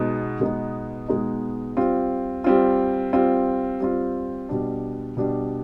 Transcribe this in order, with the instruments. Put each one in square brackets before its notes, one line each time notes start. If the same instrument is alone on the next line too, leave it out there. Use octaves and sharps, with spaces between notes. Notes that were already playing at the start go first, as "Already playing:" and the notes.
Already playing: [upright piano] B2 G#3 B3 D#4
B2 G#3 B3 D#4
B2 G#3 B3 D#4
G3 C4 F4
G3 C4 F4
G3 C4 F4
G3 C4 F4
B2 G3 D4
B2 G3 D4